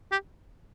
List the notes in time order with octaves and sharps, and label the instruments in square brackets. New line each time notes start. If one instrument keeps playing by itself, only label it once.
[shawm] G4